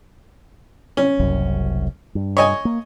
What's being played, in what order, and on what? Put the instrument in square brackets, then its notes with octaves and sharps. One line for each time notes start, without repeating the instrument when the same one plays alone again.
[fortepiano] C#4
[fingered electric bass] F#1 C2 F#2
G2
[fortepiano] C#5 D#5 G#5
[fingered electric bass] A#3